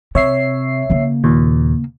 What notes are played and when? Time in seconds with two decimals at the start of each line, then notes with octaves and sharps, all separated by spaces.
0.15 C3 C#5 E5 C7
0.90 C#3 A#3
1.24 D#2 A#2